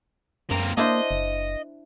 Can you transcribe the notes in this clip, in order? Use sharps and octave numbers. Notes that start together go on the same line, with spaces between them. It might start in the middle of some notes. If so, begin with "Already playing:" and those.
F#2 A#3 C4 A#5
A#3 D4 E4 C5 D#5
F#1